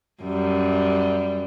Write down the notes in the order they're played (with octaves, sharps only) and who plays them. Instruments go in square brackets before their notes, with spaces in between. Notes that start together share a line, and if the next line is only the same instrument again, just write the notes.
[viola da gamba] F#2 G3